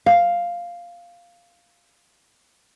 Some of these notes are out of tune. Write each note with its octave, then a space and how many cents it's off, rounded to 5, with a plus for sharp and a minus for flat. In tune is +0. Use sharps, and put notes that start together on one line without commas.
F5 +0